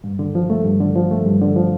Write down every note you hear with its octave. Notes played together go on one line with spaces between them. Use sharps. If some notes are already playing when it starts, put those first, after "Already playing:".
G2
D3
F3
A3
G2
D3
F3
A3
G2
D3
F3